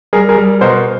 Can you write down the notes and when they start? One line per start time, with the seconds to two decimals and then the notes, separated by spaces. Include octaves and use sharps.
0.13 G3 G#4 A#4
0.29 G#4 A#4
0.37 G3
0.61 B2 A#4 C5